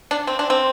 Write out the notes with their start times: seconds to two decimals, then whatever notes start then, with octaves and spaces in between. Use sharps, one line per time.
0.11 D4
0.27 C4
0.39 D4
0.50 C4